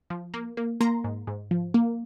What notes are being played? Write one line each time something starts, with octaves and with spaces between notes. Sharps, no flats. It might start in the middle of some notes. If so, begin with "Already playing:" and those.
F3
A#3
A#3
A#3 A#5 C6
G#2
G#2
F3
A#3